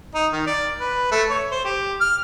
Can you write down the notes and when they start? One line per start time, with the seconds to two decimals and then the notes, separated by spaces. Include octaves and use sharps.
0.14 D#4
0.32 D#3
0.47 D5
0.80 B4
1.11 A3
1.30 C#5
1.51 C5
1.65 G4
2.01 F6